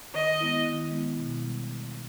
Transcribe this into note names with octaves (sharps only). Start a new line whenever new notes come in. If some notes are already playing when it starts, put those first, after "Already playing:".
D#3 D#5
G#3 B3 E4
D#3
G#3 B3 E4
B2
G3